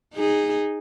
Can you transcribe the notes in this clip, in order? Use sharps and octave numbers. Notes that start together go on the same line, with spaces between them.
D#4 G#4